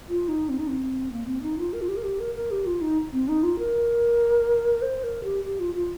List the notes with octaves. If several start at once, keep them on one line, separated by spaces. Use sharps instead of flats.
F4
D#4
C4
D#4
C4
A#3
C4
D#4
F4
A#4
F4
G4
A#4
G4
A#4
A#4
G4
F4
D#4
C4
D#4
F4
A#4
C5
A#4
G4
G4
F4
F4